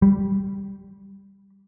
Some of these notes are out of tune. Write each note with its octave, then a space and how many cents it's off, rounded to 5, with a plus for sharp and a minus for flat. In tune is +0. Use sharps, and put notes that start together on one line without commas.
G3 +0